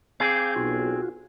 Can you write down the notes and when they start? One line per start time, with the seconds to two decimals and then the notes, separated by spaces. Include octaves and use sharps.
0.20 C4 G#4 F5 D6 G6
0.56 B1 F4 F#4